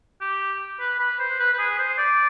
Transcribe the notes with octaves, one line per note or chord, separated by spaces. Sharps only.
G4
B4
B4
C5
B4
B4
G#4
C5
D5